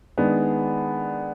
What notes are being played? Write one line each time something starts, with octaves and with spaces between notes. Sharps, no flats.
D#3 G#3 B3 D4